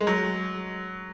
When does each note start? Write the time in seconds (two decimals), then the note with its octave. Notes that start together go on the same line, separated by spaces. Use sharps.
0.01 G#3
0.07 F#3